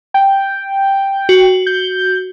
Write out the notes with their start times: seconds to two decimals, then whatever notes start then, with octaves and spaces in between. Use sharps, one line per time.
0.14 G5
1.29 F#4
1.66 G6